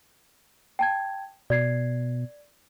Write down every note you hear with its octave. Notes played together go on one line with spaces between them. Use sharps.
G5 A5 G#6
B2 D5 G#6 C7